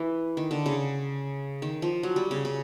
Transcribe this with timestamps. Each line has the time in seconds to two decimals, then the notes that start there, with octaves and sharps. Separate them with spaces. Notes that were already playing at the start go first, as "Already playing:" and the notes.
Already playing: E3
0.37 D#3
0.51 D3
0.66 C#3
1.62 D#3
1.82 F3
2.03 F#3
2.16 G3
2.31 C#3
2.45 C#3